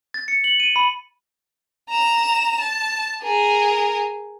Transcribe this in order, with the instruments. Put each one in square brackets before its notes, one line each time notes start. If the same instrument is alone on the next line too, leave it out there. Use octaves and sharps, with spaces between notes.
[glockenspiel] A6
C#7
F#7
D#7
B5
[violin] A#5 E7
A5
G#4 A#4